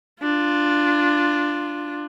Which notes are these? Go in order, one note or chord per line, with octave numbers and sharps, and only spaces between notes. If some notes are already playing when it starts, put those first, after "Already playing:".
D4 F4